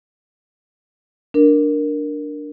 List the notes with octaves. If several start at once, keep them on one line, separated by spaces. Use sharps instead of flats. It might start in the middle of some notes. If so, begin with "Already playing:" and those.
D4 A#4